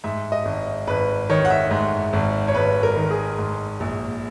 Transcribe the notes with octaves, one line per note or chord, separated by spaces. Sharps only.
G#2 E5
D#5
G#1
G#1 B4
D#3 C#5
F#5
E5
G#2
G#1
C#5
G#1 B4
A#4
D#3
G#4
G#2
A#1